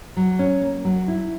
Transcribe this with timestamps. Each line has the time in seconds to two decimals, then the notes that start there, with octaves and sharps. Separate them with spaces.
0.17 F#3
0.39 C#4
0.61 A#3
0.85 F#3
1.08 E4